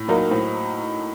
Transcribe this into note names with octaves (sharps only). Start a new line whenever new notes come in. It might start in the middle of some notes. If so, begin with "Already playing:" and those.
Already playing: A2
F#3 A#3 D#4 F#4 A#4
A2 C5